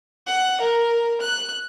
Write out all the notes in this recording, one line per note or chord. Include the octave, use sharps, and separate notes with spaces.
F#5
A#4
F#6